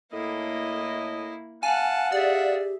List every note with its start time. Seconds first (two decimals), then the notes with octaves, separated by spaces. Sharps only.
0.13 A2 A#3 E4 D#5
1.63 F5 F#5 G#5 A5
2.12 G4 G#4 D5 E5